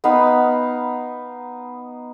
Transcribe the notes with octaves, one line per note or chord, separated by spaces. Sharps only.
B3 D#4 F5 B5